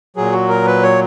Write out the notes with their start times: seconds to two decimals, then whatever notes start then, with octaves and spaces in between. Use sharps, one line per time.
0.17 A#2 F#3 G#4
0.32 F#4
0.49 A#4
0.66 B4
0.83 C#5